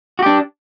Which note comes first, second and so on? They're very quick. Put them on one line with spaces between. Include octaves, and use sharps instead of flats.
F#4 G4 D4